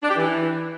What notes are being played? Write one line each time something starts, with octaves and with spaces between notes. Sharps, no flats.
D4
G4
E3